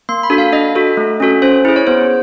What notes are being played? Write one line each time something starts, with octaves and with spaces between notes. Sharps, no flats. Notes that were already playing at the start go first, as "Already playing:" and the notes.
A#3 C6
B5
D4 F#4 A4
F5
D4 D#5
F#4 A4
A3
C#4 F#4 A4
C#4 C5
E4 G#4
C#5
B3 C5